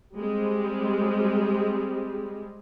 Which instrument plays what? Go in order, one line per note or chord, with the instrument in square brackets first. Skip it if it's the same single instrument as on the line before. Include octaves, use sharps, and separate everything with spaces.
[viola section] G3 G#3 C4